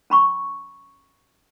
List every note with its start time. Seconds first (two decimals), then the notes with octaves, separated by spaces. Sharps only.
0.10 C#4 B5 C#6